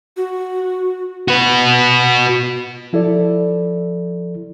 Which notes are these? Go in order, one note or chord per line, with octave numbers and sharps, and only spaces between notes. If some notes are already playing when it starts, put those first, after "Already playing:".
F#4
F#4 B4
F3 E4 A4 D5